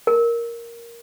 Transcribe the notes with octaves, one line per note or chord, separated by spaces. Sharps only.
A#4